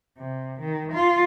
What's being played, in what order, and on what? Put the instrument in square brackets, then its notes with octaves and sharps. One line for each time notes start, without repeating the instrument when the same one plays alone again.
[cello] C3
D#3
F4